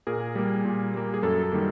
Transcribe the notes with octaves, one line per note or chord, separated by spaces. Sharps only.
A#2 G#4 A#4
G3 A#3
A#2
G3 A#3
G#4
F#2 A4
A4
D#3 G3 A#3